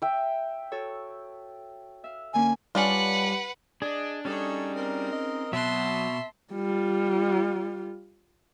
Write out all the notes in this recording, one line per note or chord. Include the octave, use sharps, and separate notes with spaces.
E5 G5
F#4 A4 C#5
E5 F5
D3 A#3 C#4 G#5
G3 C#4 D4 F4 B4 F#5
D4 G#4 D5 D#5
G3 C#4 D#4 G#4 A4 C#5
C4 A#4
D#5
B2 F#3 E5 A5 C6 F#6
G3 F4